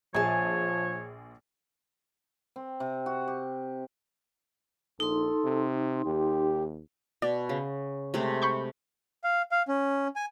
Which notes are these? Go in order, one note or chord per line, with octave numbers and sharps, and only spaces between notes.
A#1 F3 G#4 C#5 G#5 A5
C4
C3
F#4
G4
A#1 D#4 A4 C6
C3
D#2 G4
B2 D5
C#3
C3 G#3 A3
B5 C#6 G6
F5
F5
C#4
G#5